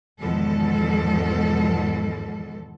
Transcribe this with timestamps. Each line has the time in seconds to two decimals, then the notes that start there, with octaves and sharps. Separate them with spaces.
0.20 E2 G#2 B2 D#3 F3 A4